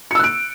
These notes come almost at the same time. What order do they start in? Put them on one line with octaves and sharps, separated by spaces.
C#7 E6 F#6 D7